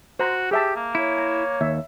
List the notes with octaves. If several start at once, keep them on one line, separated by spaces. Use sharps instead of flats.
F#4 C5 A#5
G4 G#4 E5 A5
A#3
E4 C#5
A#5
D#2 E5